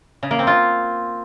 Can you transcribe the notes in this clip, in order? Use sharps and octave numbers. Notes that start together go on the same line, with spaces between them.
C#3
A#3
C4
F4